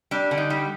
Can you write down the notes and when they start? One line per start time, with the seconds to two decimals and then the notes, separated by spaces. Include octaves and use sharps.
0.11 G3 D4
0.31 D3
0.38 D#4
0.50 G3